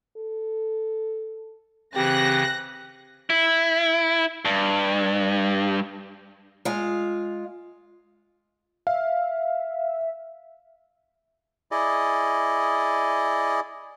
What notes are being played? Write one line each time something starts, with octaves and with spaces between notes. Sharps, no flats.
A4
C#3 E3 C4 G4 F#6 A#6
E4
G2
G#3 F4
E5 F5
E4 G#4 D5 D#5